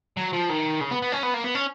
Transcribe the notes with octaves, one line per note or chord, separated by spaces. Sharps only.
F#3
F3
D#3
C#3
B3
B3
C#4
B3
A#3
B3
C#4